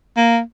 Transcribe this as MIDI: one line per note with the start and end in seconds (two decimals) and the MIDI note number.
0.17 0.39 58